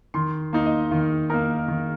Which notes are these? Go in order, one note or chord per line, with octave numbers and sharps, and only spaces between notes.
D#3 C6
A#3 D#4
D#5
D#3 F5
A#3 D#4 A#4
D#3